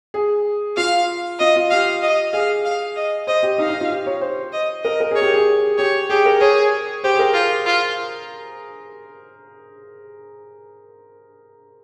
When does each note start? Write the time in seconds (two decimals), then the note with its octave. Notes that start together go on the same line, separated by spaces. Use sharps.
0.14 G#4
0.77 F4 F5
1.40 F4 D#5
1.56 F4
1.71 G4 F5
2.02 D#5
2.33 G#4 F5
2.65 F5
2.96 D#5
3.27 C5 D#5
3.43 G4
3.58 D#4 F5
3.69 D#4
3.80 F4
3.91 G4
4.06 C#5
4.21 C5
4.53 D#5
4.84 A#4 D#5
5.00 A#4
5.11 G#4 C#5
5.22 G4
5.34 G#4
5.78 G4 C#5
6.10 G4 G#4
6.25 A#4
6.41 G#4 C#5
7.04 G4 C5
7.14 G#4
7.19 A#4
7.34 F4
7.66 F4